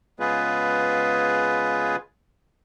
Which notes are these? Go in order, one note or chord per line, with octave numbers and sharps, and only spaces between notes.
C#3 G#3 B3 F4 G#4 B4